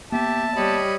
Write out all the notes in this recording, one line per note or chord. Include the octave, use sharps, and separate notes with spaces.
A#3 B3 G4 E5 A5
G3 C#5 D#5 B5